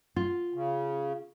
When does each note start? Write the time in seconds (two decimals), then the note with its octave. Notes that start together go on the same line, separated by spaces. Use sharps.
0.16 F4
0.54 C#3